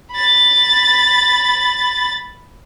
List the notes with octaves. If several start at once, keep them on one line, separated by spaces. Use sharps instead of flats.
B5 A6